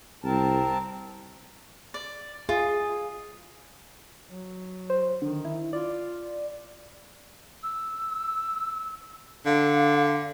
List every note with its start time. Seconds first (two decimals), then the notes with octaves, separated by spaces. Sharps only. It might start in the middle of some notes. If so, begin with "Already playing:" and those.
0.24 C2 C4 A#4 A5
1.94 D5
2.49 F4 G#4
4.30 F#3
4.90 C5
5.22 D3 D#3
5.45 E4
5.73 F4 D5
7.63 E6
9.46 D3 F5